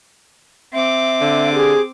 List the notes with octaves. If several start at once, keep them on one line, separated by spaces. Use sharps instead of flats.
C4 E5 D6
D3
G4 G#4